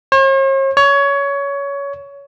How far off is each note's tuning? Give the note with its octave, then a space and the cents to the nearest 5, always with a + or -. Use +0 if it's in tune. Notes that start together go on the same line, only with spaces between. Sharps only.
C#5 -45
C#5 +20